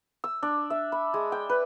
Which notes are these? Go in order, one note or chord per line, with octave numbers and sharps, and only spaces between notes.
E6
D4
E5
B5
G#3
G5
B4